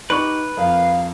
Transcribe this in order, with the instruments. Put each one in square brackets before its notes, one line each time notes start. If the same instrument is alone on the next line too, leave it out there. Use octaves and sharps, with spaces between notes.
[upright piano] D#4 C#6 [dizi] G4 [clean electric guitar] B4
[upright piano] F2 A#4 [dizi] F5